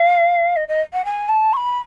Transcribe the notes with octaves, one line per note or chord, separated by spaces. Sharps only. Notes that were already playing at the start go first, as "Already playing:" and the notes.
Already playing: F5
D#5
D#5
F#5
G#5
A5
C#6
B5